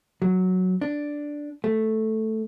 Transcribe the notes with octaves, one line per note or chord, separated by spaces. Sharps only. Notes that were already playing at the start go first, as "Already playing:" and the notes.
F#3
D4
A3